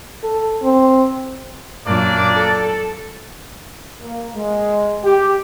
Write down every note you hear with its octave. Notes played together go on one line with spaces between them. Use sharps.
A4
C4
F#2 A#2 A#3 D4 D5
A4
A#3
G#3
G4